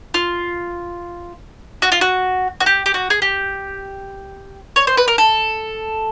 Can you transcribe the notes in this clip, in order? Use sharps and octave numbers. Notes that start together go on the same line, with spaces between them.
F4
F#4
F4
F#4
F#4
G4
G4
F#4
G#4
G4
C#5
C5
B4
A#4
A4